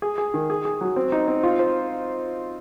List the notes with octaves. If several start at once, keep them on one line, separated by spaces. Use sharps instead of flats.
G#4
G#4
D#3
G#4
G#4
F#3
C4
D#4
C4
F4
C5